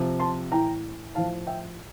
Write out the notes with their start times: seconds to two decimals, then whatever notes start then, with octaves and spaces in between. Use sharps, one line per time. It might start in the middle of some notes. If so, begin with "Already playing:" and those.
Already playing: C3 F3
0.19 A5 C6
0.51 A2 E3 G5 A#5
1.15 A2 F3 F5 A5
1.47 E5 G5